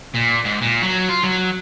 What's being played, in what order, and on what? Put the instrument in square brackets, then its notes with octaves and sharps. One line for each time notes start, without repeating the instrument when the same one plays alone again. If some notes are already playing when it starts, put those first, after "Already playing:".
[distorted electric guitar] A#2
G#2
A#2
F#3
F4
F#3